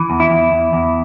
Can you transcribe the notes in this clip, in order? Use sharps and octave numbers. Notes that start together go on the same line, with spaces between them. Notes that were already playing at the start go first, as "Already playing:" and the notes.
Already playing: E3
E2
E4
E2
E2
E2